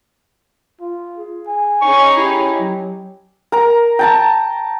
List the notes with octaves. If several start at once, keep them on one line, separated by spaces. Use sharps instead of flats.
F4
G#4
G#5
C#4 D#4 G#4 C#6
E4 G4
F#3
A#4 A#5
G5 A5 A#5